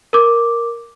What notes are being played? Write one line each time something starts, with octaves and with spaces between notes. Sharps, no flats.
A#4 D6